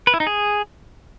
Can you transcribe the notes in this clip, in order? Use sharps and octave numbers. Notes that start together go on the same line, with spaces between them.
B4
E4
D#4
G#4